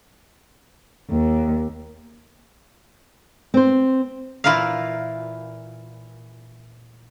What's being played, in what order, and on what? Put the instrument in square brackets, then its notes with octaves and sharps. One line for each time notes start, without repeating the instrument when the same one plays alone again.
[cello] D#2
[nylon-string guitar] C4 C5
[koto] A#2 E3 E4 F4 A#4 F5